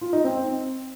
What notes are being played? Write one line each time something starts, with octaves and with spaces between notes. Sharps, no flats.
F4
D#4
C4